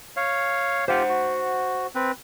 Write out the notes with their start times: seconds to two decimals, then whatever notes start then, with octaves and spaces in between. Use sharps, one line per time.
0.17 C#5 F5
0.88 F4 G4 C5 F#5
1.09 F#4
1.95 C4 B4